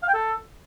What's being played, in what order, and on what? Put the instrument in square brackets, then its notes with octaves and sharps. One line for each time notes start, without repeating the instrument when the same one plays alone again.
[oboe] F5
G5
A4